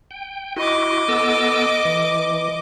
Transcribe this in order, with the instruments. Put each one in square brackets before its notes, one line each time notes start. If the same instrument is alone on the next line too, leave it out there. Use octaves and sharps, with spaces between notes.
[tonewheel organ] G5
[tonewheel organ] E4 F#4 [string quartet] D#5 D6
[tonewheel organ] B3 A4 E6
E3